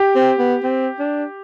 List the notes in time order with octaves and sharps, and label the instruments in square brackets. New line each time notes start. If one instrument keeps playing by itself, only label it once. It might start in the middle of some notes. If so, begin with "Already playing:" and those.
Already playing: [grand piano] G4
[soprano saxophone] C4
B3
C4
D4